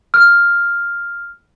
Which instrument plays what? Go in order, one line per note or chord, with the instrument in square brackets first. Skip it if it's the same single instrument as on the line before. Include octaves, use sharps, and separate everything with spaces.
[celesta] F6